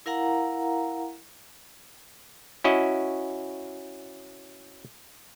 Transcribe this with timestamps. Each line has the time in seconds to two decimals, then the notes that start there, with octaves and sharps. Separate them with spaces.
0.06 E4 A#4 F5 F#5 A#5
2.64 C#4 E4 F#4 D#5